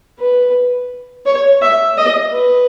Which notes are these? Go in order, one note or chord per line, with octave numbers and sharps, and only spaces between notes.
B4
C#5
E5
D#5
B4